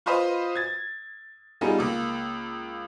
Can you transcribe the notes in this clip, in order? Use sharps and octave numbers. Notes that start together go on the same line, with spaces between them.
F4 B4 C5 D#5 F5
G#6 A6
G3 B3 D#4 F4 G#4 A4
C#2 A#3